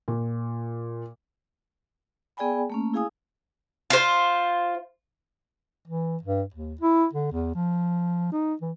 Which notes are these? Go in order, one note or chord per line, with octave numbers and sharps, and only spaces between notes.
A#2
B3 G#4 D5 G5 G#5 B5
A3 A#3 C#4
E4 G#4 F5 G#5 D#6
F4 C5
E3
G2
D#2
E4
D3
E2
F3
D#4
E3